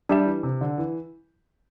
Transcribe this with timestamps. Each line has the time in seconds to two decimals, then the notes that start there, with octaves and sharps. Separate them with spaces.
0.09 G3 D4 G4 E5 A5
0.25 E3
0.43 C3
0.61 D3
0.78 E3